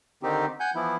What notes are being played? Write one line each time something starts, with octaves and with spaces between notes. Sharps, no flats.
D3 D#3 C4 D#4 G4
F#5 G#5 G6
E3 F3 B3 E4